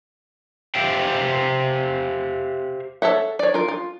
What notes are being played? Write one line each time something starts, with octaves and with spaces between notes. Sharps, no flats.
G4 C5 E5 F5 G5
A4 C#5 E5 F#5
C#5 D5
F4 A#4
F4